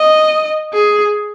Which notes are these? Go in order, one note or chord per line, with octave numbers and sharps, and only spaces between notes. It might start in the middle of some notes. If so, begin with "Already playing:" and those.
Already playing: D#5
G#4